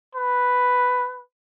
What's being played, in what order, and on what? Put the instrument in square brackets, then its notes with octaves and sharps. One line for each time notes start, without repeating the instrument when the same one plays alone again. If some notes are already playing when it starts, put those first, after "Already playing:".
[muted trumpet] B4